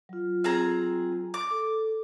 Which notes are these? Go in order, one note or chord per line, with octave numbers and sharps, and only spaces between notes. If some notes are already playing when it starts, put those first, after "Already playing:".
F#3 F4
C4 G#4 A#5
D6
A4